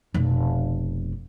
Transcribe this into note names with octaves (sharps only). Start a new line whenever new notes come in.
F1 B2